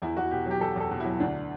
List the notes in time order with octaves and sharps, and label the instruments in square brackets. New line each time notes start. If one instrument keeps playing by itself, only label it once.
[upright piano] E2 E4
E2 F#4
B2 G4
F#3 G4
E2 A4
E2 A4
B2
F#3 E4
D2 D4